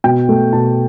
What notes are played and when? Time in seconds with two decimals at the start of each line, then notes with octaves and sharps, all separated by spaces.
0.04 B2 G5
0.29 A3
0.53 B2 A5